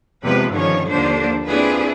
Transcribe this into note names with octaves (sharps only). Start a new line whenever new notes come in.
E2 C3 F3 G#3 B4
G2 D3 D#3 F3 C#4 C#5
D#2 D3 F3 A#3 D4 C5
C4 D4 E4 F4 G#4 B4